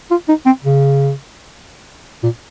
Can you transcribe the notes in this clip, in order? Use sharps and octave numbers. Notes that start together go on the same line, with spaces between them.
F4
D#4
C4
C#3
A#2